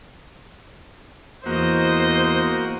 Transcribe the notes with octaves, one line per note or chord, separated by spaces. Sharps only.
E2 A#3 F#4 C5 D#5